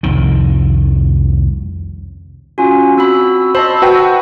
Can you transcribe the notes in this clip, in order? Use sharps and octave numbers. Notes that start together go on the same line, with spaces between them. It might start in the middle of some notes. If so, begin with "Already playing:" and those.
C2 F2 D#3
C#4 F4 F#4 G#5
C4 F#4 B5 E6
C5 D#5 A5 B5
F#4 B4 G5